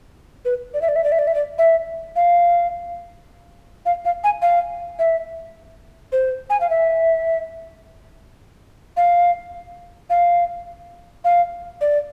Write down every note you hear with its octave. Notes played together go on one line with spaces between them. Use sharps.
B4
D5
E5
D5
E5
D5
E5
D5
E5
D5
E5
F5
F5
F5
G#5
F5
E5
C5
G#5
F5
E5
F5
F5
F5
D5